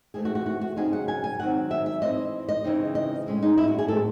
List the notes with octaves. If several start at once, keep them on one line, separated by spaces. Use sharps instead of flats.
C3 E3 A3 G#4
F#4
F#4
F#4
F#4
C#3 F#3 C4 D#4 G#4
F#5
G#5
G#5
D#3 F#3 C4 F#5
E5
E5
E3 C4 D#4 D#5
D#5
C#3 E3 C4 D#4
D#5
A2 G#3 C#4
D#4
E4
F#4
G#4
A2 G#3 C4 A4